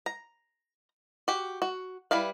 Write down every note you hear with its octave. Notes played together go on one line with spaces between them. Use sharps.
A#5
F#4 G4
F#4
G3 E4 B4 F5